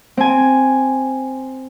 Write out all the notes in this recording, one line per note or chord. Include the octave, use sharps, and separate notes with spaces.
C4 G#5